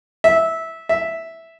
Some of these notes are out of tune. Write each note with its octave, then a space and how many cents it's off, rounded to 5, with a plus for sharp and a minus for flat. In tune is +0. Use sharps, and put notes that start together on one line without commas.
E5 -15
E5 -5